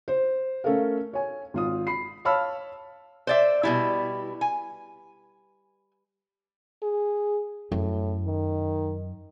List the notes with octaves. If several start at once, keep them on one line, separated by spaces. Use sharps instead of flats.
C5
A3 C#4 A4 A#4 F5
C#5 G#5
G#1 F4 D#6
B5 C7
C#5 F5 A5 B5 E6 F6
C5 D5 E5
B2 G3 E4
G#5
G#4
F#2 A2
D#3